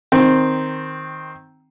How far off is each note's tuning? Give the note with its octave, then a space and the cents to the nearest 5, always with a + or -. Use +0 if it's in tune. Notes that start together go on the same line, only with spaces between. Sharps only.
D#3 +0 C4 +0